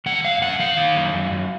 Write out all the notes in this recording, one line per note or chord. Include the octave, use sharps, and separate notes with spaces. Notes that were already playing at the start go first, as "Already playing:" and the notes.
D#3 F#5
F#2 F5
F#2 F#5
D#3 F5
D#3
F#2
F#2
F#2